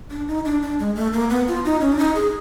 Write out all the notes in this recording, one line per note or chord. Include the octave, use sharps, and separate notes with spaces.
D4
D#4
D4
D4
G#3
A3
A#3
B3
F4
D#4
C#4
D4
D#4
G#4